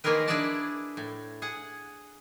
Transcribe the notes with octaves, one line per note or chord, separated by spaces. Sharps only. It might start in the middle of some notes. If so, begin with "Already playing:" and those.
D#3 A#3 F4 G#4 A#4 B4
D4 E4 G#4 B4 D5 A5
A2
G#4 F#5